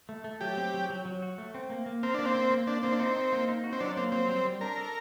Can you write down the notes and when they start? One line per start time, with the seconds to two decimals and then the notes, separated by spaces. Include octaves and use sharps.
0.09 A3
0.24 A3
0.41 F#3 G4
0.57 C4
0.74 F#3
0.90 F#3
1.05 F#3
1.22 F#4
1.38 A3
1.54 C4
1.70 A#3
1.86 A#3
2.03 C4 A#4
2.14 A#3 D4
2.25 C4
2.35 A#3
2.50 A#3
2.67 A#3 D4
2.83 A#3 C4
2.92 D4
2.99 C4 D#4
3.16 D#4
3.32 A#3
3.49 D#4
3.64 F#4
3.73 C4
3.80 F#3 D4
3.97 A#3 C4
4.12 F#3 C4
4.28 G3
4.45 G3
4.61 D4 A#4
4.78 A4